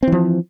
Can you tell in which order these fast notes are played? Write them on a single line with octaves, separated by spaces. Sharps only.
C4 E3 F3